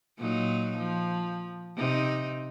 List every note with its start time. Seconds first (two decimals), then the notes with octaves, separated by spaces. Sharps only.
0.18 A#2 F#3 D#4
0.77 F3
1.77 C3 D#4